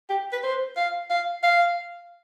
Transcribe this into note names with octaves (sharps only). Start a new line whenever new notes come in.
G4
B4
C5
F5
F5
F5